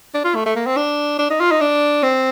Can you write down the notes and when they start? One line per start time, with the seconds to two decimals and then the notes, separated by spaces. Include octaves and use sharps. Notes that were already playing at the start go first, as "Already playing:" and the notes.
0.14 D4
0.24 F4
0.35 A3
0.46 A3
0.56 A#3
0.66 C4
0.77 D4
1.19 D4
1.30 D#4
1.40 F4
1.51 D#4
1.61 D4
2.03 C4